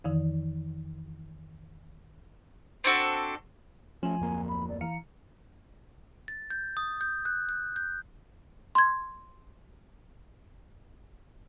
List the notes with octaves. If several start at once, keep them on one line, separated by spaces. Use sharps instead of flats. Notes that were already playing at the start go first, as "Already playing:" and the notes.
F2 D#3 E3
C4 D4 F#4 A4
F3 A3 C#4 G#5
D1 F2 A#3
B5
D5
E3 F5 A#5 C#7
A6
G6
D#6
G6
F#6
F#6
G6
C6 G#6